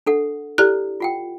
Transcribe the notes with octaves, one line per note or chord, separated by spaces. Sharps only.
D4 A4 F#5
E4 G4 A4 D5 F#6
F4 F#5 G5